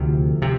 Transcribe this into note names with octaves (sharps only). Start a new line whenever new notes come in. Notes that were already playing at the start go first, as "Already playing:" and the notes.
Already playing: D2 C3 F3
C3